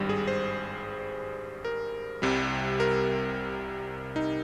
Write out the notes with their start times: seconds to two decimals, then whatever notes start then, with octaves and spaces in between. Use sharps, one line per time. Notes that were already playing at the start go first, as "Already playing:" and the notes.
Already playing: G#1 G2 G3
0.09 G#4
0.28 C5
1.65 A#4
2.22 C2 C3 G3
2.80 A#4
4.16 D#4